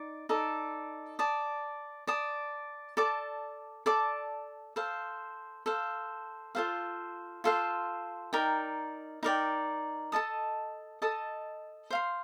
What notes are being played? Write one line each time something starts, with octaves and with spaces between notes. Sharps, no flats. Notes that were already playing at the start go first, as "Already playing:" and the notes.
Already playing: D#4 D5
D#4 A4 D5
D5 A5 D#6
D5 A5 D#6
A4 D5 A5 D6
A4 D5 A5 D6
A4 C5 F5
A4 C5 F5
F4 A4 C5 F5
F4 A4 C5 F5
D#4 A#4 D5 G5
D#4 A#4 D5 G5
A4 D#5 A5 D#6
A4 D#5 A5 D#6
C5 F5 C6